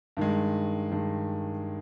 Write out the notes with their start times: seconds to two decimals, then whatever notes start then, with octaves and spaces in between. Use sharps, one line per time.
0.17 G2 D#3 G#3
0.91 G2 D#3 G#3